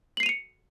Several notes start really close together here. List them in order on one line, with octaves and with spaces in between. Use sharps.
F#7 C7 D#7 F7 C#7